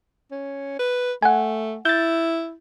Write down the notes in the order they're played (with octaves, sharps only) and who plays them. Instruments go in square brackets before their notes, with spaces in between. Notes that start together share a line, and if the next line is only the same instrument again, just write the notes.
[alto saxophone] C#4
B4
[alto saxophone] A3 [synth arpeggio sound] F#5 G#5
[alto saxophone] E4 [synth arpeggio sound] G6 A6